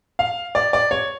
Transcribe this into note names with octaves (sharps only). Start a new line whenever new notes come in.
F5
D5
D5
C#5